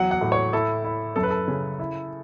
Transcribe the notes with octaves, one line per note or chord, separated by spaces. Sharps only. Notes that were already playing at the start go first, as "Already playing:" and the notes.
Already playing: E2 F#3 F#5
F#5
A2
C#5
E4 A4
E4
F#2 A4
B4
A4
C#3
E4